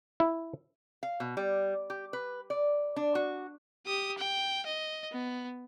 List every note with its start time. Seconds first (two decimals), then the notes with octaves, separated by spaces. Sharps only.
0.20 E4
1.03 F5
1.20 B2
1.37 G3
1.90 G4
2.13 B4
2.50 D5
2.96 D4
3.15 F#4
3.87 G4 D#6
4.18 G5
4.66 D#5
5.12 B3